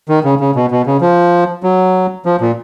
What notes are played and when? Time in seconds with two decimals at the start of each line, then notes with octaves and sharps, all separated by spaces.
0.09 D#3
0.24 C#3
0.40 C#3
0.55 B2
0.71 B2
0.86 C#3
1.01 F3
1.63 F#3
2.26 F3
2.41 A#2